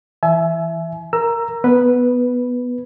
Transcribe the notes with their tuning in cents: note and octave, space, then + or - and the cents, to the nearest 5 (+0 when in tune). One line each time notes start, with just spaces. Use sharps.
E3 +0 E5 +10 G#5 +40
A#4 +0 A#5 +0 E6 +25
B3 +0 B4 +0